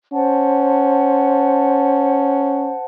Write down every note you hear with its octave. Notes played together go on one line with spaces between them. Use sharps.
C#4 C5 F#5 A5